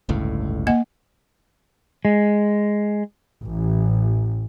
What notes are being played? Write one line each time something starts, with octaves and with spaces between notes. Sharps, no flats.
G1 C#2 A2
A#3 D#5 F#5
G#3
A1